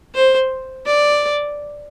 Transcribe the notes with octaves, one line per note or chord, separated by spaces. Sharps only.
C5
D5